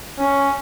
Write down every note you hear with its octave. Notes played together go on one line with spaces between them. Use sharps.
C#4